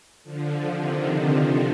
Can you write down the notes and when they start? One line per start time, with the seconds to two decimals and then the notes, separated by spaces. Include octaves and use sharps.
0.24 D3 F3
0.71 C3 D#3
1.19 D3